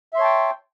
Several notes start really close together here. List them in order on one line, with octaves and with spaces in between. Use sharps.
E5 C6 C#5 A5 G5